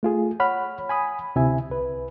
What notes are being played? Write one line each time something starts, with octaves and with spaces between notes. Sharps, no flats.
A3 F4 G#4
C#5 F#5 B5 F6
G#5 B5 D#6
D2 C3 E4 E5 G#5
C2 B4